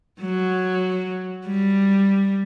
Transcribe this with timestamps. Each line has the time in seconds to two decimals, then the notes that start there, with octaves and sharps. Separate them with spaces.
0.20 F#3
1.46 G3